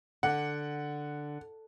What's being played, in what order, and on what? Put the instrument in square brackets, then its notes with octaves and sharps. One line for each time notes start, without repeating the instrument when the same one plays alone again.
[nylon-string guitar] D3 [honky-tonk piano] F#5